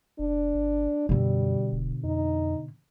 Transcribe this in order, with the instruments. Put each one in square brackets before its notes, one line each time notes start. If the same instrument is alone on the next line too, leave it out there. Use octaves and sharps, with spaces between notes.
[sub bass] F1 [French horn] D4
[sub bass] G1
[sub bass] F#2 [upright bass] B2 D3 [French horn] G3
[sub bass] D#1
[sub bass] F2 [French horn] D#4